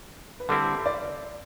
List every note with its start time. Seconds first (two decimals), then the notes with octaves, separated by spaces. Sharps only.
0.40 B4
0.49 D3 G3 C4 E4 A4
0.86 D5